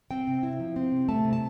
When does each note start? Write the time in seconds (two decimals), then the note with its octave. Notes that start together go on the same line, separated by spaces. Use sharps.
0.11 C4 G5
0.27 C3
0.43 E4
0.60 F3
0.76 C4
0.92 C3
1.09 A3 A5
1.25 C3
1.33 A5